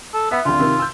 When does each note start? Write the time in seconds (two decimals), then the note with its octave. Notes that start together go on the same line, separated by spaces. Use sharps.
0.14 A4
0.31 B3 E5
0.45 G#1 D2 F4
0.59 C3 D#3
0.79 E6 G6